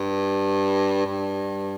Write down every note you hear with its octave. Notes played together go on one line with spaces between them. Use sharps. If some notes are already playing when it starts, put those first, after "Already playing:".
Already playing: G2
G2